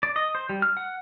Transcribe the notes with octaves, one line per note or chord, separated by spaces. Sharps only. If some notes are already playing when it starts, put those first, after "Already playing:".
D5
D#5
C5
G3
F6
F#5